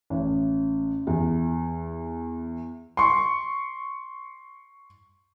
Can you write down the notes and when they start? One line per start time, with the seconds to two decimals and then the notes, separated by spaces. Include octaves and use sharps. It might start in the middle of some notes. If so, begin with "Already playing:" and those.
0.10 A1
1.07 E2
2.97 C6 C#6